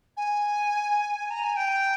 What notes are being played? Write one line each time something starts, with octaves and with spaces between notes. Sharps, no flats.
G#5
A#5
G#5
G5